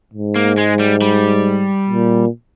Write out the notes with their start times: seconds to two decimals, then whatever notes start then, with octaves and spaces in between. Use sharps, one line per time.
0.14 G#2
0.36 A#3
0.58 G#3
0.79 G3
1.01 G3
1.89 A#2